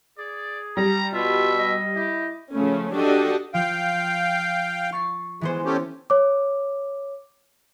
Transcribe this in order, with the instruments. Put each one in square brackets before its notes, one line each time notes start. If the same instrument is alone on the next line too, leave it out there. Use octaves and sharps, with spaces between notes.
[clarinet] G#4 [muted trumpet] D5
[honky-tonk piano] G3 [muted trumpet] A#5
[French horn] B2 [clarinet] F4 [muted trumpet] E5
[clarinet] D#5
[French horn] E4 [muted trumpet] G4
[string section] C#3 F3 A3 C#4
D4 F#4 G4 A4 D5 D#5
[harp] F3 [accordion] F5 G5
[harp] C#6 A6 C7
[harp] E3 B3 C5 [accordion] G#3
[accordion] A3 C#4 G4
[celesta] C#5 D6